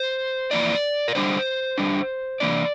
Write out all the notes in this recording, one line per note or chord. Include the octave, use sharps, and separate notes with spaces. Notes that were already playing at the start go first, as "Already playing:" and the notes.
Already playing: C5
F2 E3 A#3 D4 D5
A#4
D3 G3 D4 C5
D3 G3 D4
C3 E3 A#3 D4 D5